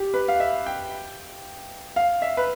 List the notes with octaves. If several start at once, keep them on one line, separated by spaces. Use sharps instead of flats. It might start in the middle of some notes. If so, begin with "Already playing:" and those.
Already playing: G4
B4
F5
E5
G5
F5
E5
B4